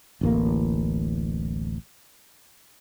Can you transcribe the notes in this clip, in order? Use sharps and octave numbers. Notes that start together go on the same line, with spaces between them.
D1 A1 A#3